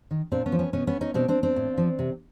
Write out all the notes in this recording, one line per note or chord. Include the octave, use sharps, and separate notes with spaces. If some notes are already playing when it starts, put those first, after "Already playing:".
D#3
A#2 C4 D4
B3 C#4
F3
B3 C#4
B2 B3 C#4
B3 C#4
C#4 D#4
B2 C4 D4
C4 D4
C4 D4
A2
F3
C3